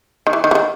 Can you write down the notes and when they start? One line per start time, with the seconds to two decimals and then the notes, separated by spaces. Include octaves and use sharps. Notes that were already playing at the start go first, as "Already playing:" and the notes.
0.27 D#3
0.33 E3
0.44 D#3
0.51 E3
0.55 D#3